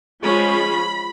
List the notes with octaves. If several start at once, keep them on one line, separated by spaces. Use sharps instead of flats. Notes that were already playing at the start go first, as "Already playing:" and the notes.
F3 G#3 C#4 F4 B5